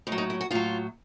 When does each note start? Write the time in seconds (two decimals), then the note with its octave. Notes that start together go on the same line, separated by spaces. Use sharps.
0.07 A2 D#4
0.12 F#3
0.18 D#4
0.30 E4
0.41 F#4
0.51 A2 F#3 F4